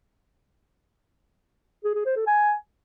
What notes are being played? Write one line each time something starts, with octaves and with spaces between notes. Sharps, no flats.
G#4
G#4
C5
A4
G#5